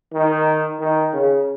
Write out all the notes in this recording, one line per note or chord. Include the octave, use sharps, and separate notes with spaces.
D#3
D#3
C#3